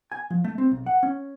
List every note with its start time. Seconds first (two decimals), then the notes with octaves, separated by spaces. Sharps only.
0.12 G#5
0.30 F3
0.44 A3
0.58 C4
0.72 B1
0.86 F#5
1.03 C#4